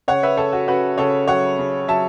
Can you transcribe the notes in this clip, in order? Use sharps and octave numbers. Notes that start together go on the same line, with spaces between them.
C#3 C#5 F#5
B4 E5
C#3 A4 C#5
F#4
C#3 F#4 B4
C#3 A4 C#5
F#3 C#5 F#5
C#3
F#3 E5 A5